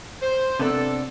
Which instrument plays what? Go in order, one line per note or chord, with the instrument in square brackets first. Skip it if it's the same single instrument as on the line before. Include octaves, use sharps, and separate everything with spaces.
[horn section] C5
[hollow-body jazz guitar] C3 B3 D4 [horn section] A4